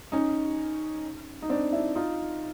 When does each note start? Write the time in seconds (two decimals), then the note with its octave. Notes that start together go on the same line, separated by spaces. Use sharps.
0.12 C#4 D#4
1.42 D#4
1.49 C4 D4
1.73 D4 E4
1.95 D#4 F4